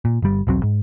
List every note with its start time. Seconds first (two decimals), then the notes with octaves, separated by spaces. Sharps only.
0.05 A#2
0.22 G1 G3
0.47 E1 B1 F#3 C4
0.63 G#2